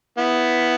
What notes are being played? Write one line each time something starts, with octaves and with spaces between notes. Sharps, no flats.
B3 E4